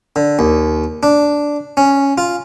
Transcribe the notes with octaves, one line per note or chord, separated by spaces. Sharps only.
D3
D#2
D4
C#4
F4